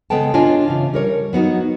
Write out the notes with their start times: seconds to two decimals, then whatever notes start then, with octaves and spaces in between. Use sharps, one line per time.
0.10 C#3 G#3 B3 A4 G5 A5
0.34 D4 F4 C#5 D#5 G#5
0.68 C#3 E3
0.93 G3 A#4 C#5
1.33 F#3 B3 D#4 F#4